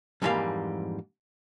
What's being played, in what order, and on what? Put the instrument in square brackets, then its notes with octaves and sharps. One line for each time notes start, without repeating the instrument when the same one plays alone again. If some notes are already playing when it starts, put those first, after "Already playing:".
[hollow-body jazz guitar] F2 G#2 E3 G3 A#3 F5